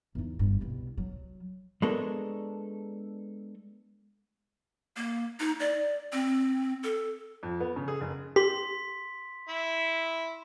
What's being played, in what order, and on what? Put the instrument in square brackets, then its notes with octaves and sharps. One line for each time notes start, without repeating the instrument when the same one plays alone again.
[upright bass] E2 D#4
G1 G2
C2 B2
F#3
[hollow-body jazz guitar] G#3 B3 D4 A4 A#4 C#5
[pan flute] A#3
D#4
D5
C4
A4
[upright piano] F2
B3
C#3
G#4
F#1
[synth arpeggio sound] G4 [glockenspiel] C6 B6
[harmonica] E4